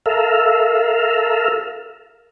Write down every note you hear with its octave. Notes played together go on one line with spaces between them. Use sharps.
A4 A#4 E5 F5